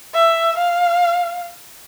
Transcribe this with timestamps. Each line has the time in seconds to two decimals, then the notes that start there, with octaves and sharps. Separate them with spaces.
0.14 E5
0.58 F5